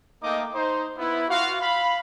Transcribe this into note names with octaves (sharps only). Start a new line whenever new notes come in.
A3 A#3 D#4 D#5 G5 D6
D#4 C5
B3 E4
F4 F#4 F5
F5 B5